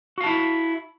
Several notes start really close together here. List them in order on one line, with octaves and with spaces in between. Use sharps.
F#4 F5 A5 E4